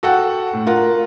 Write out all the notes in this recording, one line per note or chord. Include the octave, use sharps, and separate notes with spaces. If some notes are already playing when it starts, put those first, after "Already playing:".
F#4 A4 F#5 G5
A2
F4 A#4 F#5